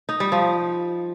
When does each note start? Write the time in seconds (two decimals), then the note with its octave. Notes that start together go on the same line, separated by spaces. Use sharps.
0.09 D#4
0.20 G3
0.32 F3